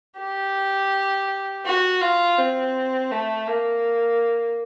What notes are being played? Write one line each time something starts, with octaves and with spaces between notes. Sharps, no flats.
G4
F#4
F4
C4
A3
A#3